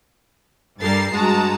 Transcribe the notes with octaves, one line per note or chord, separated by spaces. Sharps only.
G2 G3 A4 A#4 A6 C7
G2 G#3 F#4 A5 A#5